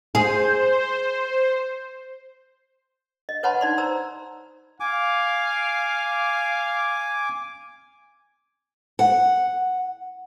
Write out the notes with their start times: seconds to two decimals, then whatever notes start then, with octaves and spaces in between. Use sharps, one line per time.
0.15 G#4 C5
3.29 D#5
3.43 B4 C#5 F#5 A5 B5 C6
3.61 D#4 D5 C6
3.78 C5 A#5 E6
4.80 F5 G#5 D6
8.99 F#5